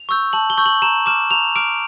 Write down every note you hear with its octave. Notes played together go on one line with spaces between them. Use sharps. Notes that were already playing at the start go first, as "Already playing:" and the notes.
Already playing: F7
C#6 E6 G6
A5 F#7
G7
C#6 E6 G6
F#7
A#5 E7
D6 F6 E7
A#5 F7
D6 F6 D7